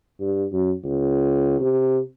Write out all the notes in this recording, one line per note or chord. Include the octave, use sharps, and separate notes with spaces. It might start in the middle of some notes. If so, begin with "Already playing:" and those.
G2
F#2
C#2
C3